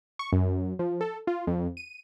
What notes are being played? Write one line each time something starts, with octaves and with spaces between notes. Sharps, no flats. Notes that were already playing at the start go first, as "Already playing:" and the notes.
C#6
F#2
F3
A4
F4
F2
D#7